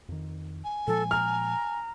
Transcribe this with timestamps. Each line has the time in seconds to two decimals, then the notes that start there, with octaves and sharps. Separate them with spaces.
0.09 F2 D#3
0.64 G#5
0.87 A#2 F3 G#3 A4
1.11 A#5 F6